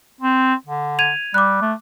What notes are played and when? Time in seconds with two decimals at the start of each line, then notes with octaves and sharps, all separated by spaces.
0.21 C4
0.67 D3
0.99 G#6 D#7 F7
1.34 G3 D6 F#6
1.62 A3